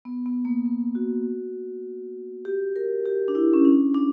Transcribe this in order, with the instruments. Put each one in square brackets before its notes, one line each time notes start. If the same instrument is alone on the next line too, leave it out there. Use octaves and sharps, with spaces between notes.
[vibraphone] B3
B3
A#3
B3
F#4
G4
A#4
G4
D4
E4
C#4
D4
D4